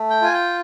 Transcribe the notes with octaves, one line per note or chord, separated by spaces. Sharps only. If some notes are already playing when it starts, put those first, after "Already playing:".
Already playing: A3
G5
F4 G#5
G5